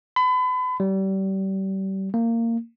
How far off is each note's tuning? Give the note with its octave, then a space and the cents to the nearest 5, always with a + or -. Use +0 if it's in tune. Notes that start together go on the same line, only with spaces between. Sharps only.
B5 +35
G3 -30
A#3 -20